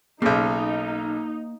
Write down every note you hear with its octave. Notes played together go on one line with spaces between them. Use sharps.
B1 C#3 A#3 D#4 E5